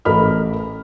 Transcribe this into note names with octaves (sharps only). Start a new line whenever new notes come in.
A1 A4 A#4 D#5 B5 F6